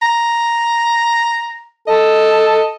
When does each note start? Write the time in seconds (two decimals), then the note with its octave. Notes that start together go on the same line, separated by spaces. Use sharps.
0.02 A#5
1.88 A4 D#5